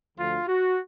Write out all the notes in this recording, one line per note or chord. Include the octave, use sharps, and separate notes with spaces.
D2 D3 F3 F4
F#4